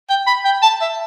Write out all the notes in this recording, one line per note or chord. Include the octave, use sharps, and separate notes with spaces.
G5
B5
G5
A5
E5